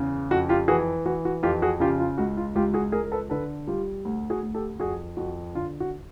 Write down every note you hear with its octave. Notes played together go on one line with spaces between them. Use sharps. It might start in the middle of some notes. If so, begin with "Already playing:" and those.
Already playing: E2 C#3
F2 F#4
F4 G4
E3 F#4 G#4
E3 F#4
F#4
F2 F4 G4
F#4 G#4
C#3 F4 G4
F4
C#2 F#4
F4
C#2 F4 G4
F#4 G#4
C#2 G#4 A#4
A#4
A4 B4
D3 A4 B4
G3 F4 G4
D2
F#4 G#4
D2
G4 A4
F2 F#4 G#4
F2 F#4
D3 F4
F#4